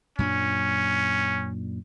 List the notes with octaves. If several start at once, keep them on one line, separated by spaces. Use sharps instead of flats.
F#2 A#2 C#4 D4